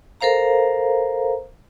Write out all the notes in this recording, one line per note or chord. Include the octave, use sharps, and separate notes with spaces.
A4 A#4 C5 F5 A#5